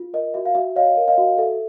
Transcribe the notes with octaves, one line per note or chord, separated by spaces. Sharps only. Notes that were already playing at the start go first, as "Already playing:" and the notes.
Already playing: F4
A#4 D#5
F#4 E5
F5
F#4 E5
C#5 D#5 F5
A#4
D#5 F5
F#4
A4 E5